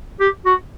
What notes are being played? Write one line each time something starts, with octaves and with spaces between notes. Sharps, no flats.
G4
F#4